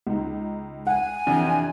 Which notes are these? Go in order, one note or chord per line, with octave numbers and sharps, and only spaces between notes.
C#2 D#4
F#5 G#5
F2 C3 E3 D4